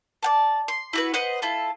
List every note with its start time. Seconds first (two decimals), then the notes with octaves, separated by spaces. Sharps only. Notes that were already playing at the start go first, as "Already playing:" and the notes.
0.23 D5 F#5 A5
0.68 C6
0.93 E4 F#4 B4
1.14 B4 C5 D#5 F#5
1.42 E4 F4 A4